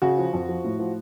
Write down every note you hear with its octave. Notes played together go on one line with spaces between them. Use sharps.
C#3 F#4
F3
F2
F3
A2
F3